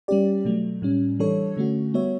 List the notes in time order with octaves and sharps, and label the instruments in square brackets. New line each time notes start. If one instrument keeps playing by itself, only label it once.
[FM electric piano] G3 C#4 G4 D5
B2 F#3 A3
A2 G3 C#4
E3 G3 D4 A4 C#5
D3 A3 C#4 F#4
G3 B3 F#4 C#5 E5